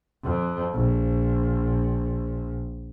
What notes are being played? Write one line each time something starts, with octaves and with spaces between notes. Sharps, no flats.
F2
A#1